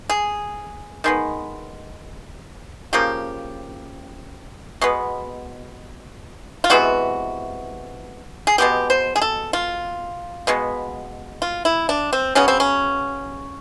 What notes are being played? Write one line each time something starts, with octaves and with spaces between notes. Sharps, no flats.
G#4
D#3 G#3 B3
C#3 F3 A#3 G4
B2 G#3 B3
F4
C3 E3 G#3 B3 F#4
G#4
B2 G#3 B3 G4
C5
G#4
A4
F4
B2 G#3 B3
F4
E4
D4
C4
C#3 F#3 B3 C#4
C4
C#4